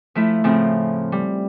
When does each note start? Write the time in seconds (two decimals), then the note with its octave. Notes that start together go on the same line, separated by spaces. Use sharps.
0.15 F3 A3 E4
0.44 A2 C#3 F3 C4
1.12 G3